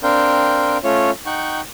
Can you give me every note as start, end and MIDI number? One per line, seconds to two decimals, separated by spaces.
0.03 0.78 60
0.03 0.78 62
0.03 0.78 70
0.03 0.78 77
0.03 0.78 79
0.84 1.11 57
0.84 1.11 61
0.84 1.11 65
0.84 1.11 73
1.26 1.61 63
1.26 1.61 78
1.26 1.61 79
1.26 1.61 85